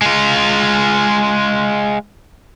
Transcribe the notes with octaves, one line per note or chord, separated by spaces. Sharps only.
G#3 F4